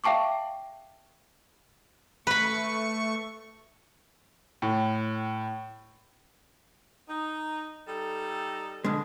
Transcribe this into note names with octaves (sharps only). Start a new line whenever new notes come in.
E5 F5 G5 A5 C#6 D6
A3 B4 B5 C#6
A2
D#4
G3 D#4 A4
B2 D3 G#3